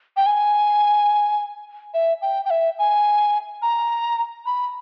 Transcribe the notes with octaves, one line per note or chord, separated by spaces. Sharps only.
G5
G#5
E5
G5
G5
E5
G#5
A#5
B5